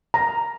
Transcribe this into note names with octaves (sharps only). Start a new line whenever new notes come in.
A#5